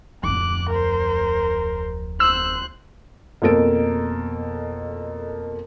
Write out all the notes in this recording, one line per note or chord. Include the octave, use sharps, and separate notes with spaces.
D1 F2 D6 F#6
A#4 C5
C5 E6 F#6
F2 B2 A#3 A4 D7